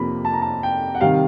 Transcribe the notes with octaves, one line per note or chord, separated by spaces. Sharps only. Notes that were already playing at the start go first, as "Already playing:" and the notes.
Already playing: F2 C3 F3 A#3 B5
A5
A#5
A5
G5
F#5
C3 D#3 G3 F5